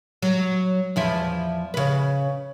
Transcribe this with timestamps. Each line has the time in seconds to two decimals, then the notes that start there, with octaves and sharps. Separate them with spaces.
0.22 F#3
0.96 E2 F3 E4
1.74 C#3 B4